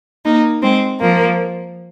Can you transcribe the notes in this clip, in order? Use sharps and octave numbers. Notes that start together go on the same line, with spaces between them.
A#3 D#4
G#3 C4
F3 A#3